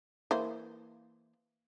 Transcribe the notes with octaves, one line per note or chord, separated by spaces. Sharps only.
E3 A#3 C5